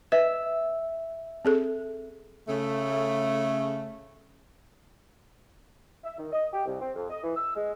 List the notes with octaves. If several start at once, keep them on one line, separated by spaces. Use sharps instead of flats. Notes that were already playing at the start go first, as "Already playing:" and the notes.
B4 E5
C4 G#4 A4
C#3 A3
E5
D#3
D#5
G4
C2
C4
F2
D#5
E3
E6
G#3